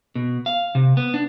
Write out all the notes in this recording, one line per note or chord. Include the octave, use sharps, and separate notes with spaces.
B2
F5
C3
B3
D4